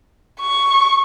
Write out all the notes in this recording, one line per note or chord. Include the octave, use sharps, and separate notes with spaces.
C#6